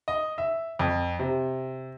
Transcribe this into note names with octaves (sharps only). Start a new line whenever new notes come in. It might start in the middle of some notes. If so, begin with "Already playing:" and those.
D#5
E5
F2
C3